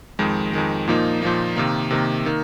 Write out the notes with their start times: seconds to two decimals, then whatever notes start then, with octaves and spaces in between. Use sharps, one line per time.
0.19 F2 D#3 G#3
0.53 F2 D#3 G#3
0.88 A#2 F3 A#3 D#4
1.22 A#2 F3 A#3 D#4
1.56 C3 D#3 A#3
1.91 C3 D#3 A#3
2.26 D#3 A#3